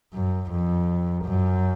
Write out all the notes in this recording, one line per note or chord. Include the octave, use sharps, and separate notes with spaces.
F#2
F2
F#2